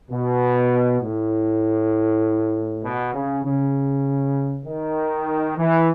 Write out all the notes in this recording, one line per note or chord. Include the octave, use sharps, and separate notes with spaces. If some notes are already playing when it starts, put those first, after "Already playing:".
B2
A2
B2
C#3
C#3
D#3
E3